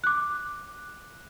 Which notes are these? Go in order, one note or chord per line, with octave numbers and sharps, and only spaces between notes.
D6 F#6